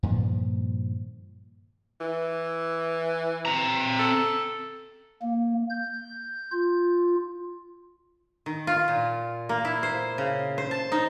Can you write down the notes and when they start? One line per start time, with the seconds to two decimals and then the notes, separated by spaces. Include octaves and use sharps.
0.03 G2 A#2 D#3 F3
2.01 E3
3.45 C4 A#5
3.99 A4
5.22 A#3
5.70 G6
6.52 F4
8.46 D#3
8.67 F4
8.88 A#2
9.49 A#3
9.65 E4
9.83 C5
10.18 C#3
10.58 C5
10.71 A5
10.92 D#4